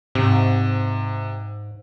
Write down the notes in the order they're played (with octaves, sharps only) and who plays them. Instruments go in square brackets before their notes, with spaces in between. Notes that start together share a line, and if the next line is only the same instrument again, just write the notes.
[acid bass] G#2 [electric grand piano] C3